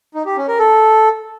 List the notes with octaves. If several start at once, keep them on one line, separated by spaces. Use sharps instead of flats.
D#4
G4
C#4
A#4
A4